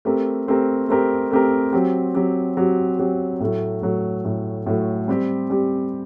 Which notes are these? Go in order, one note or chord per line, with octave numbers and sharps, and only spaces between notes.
A3 C4 G4 A#4
A3 C4 G4 A#4
A3 C4 G4 A#4
A3 C4 G4 A#4
F#3 C4 G4
F#3 C4 G4
F#3 C4 G4
F#3 C4 G4
A2 F#3 A3
A2 F#3 A3
A2 F#3 A3
A2 F#3 A3
G3 C4 G4
G3 C4 G4